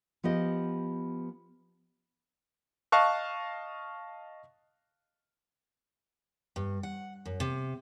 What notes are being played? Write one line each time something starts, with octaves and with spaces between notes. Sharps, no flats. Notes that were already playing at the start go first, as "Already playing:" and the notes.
F3 B3 G4 D#5
D#5 F5 A5 C#6 F#6
G2
F#5
F#2
C3